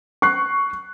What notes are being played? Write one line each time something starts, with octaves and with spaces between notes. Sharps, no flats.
C#6 F#6 C7